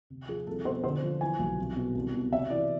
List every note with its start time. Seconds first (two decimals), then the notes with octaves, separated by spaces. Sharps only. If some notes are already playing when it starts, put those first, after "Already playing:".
0.10 C3
0.28 F3 G#4
0.47 C2 A4
0.65 B2 C5
0.84 D3 C5
1.02 F3
1.21 E3 G#5
1.39 B1
1.58 C2
1.76 B2
1.95 C2
2.14 B2
2.32 C3 E5
2.50 E3 D5